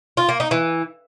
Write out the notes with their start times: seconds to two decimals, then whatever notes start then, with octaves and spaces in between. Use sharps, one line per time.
0.17 F4
0.29 A#3
0.40 D#4
0.51 E3